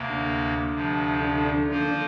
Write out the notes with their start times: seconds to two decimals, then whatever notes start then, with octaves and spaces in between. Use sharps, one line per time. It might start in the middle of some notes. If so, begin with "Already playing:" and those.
Already playing: D2 C3 A#3
0.10 D3
0.73 D2 C3 F3
1.21 D3
1.44 D3
1.68 D3 F3 A#3 F4 C5
1.85 D3